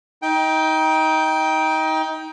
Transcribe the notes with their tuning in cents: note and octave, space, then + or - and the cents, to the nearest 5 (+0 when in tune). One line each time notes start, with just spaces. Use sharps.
D#4 +25 G5 +0